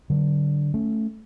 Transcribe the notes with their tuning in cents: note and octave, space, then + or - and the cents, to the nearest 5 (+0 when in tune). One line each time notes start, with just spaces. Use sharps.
D3 +0 F#3 +40
A3 +0 C#4 +5